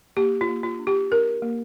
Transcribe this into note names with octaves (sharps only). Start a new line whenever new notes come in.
A#3 G4
F4
A#3
F4
D4
G4
D4 A#4
A#3